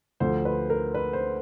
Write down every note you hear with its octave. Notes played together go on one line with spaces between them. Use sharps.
D2 D3 F3 C5
B4
A#4
B4
C5